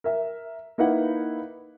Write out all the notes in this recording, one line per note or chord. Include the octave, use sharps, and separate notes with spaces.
A#4 E5
A#3 D#4 E4 B4 F5 F#5